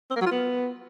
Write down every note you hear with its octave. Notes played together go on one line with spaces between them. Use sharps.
C4
A#3
F#3
F4
B3